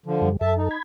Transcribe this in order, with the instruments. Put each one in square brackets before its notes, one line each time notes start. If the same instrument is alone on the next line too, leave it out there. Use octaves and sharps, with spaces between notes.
[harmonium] D3 F3
[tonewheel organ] F#2 G3
[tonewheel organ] F#2 A4 [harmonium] E5 A5
[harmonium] D#4
[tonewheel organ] B5 G#6